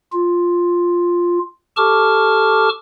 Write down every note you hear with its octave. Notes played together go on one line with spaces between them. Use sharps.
F4
G4 A4 A5 C#6 D6 F6